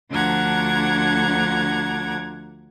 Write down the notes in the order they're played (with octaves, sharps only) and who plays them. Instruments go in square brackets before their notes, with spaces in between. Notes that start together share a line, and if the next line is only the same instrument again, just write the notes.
[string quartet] D2 F3 D4 F#5 A#5 G#6